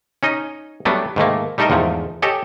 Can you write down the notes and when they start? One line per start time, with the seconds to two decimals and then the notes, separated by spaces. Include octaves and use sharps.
0.23 C#4 D#4 D#5
0.85 F#3 G3 A3 B3 D4
1.16 G#2 D#3 A3 A#3
1.58 G3 A3 D#4 A4 A#4 D#5
1.70 E2 G#2 F3 A3
2.22 G4 A4 C#5 D#5 G#5